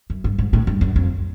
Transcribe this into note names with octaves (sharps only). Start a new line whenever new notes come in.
F#2
G2
G#2
A2
G2
F#2
F2